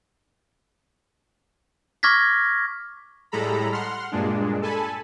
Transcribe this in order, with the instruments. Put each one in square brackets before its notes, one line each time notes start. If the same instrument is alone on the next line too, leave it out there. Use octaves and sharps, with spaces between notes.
[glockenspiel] C#6 D6 F6 G#6 A#6 B6
[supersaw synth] A2 G3 G#3 A4 A#5 B5
F#5 C6 F6
G2 A#2 G#3 D4
A4 G#5 A5 B5